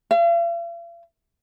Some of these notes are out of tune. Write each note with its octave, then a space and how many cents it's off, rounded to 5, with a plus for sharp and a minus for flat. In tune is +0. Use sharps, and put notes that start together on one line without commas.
F5 -45